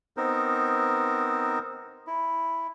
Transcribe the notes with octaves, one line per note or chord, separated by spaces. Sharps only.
B3 C4 D#4 A#4 C5
E4